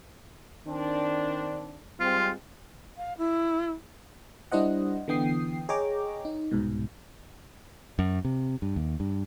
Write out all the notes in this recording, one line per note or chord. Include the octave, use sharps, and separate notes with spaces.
D#3 C4 D4
G3 G#3 C4 F4
F5
E4
G3 D4 E4 C5 D#5 F#5
D3 E3 B3 G5 D#6 C7
G#4 C#5 D#5 G5 A#5 D6
D#4
C2 G#2 B2
F#2
C3
G2
D#2
G2